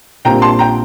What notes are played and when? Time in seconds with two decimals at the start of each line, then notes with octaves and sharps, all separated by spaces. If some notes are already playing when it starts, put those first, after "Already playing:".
0.25 A#1 A#2 G3 C4 F4 G5 A#5
0.42 A5 C6
0.59 G5 A#5